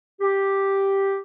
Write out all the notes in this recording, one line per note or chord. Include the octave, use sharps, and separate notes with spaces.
G4